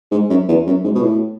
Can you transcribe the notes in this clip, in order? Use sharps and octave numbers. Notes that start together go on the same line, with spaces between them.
G#2
F#2
E2
F#2
G#2
B2
A2